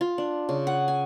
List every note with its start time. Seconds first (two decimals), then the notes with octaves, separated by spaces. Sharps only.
0.01 F4
0.18 D4
0.49 C#3
0.67 F#5
0.88 G#5